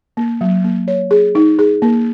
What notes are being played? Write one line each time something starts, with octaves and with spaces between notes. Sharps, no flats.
A#3
F#3
A#3
C#5
G#4
D#4
G#4
A#3